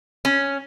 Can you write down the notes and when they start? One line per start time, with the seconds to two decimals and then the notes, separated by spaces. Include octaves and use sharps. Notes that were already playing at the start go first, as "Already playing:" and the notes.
0.25 C#4